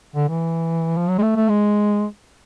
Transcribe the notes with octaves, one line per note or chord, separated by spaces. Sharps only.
D3
E3
F3
F#3
G#3
A3
A3
G#3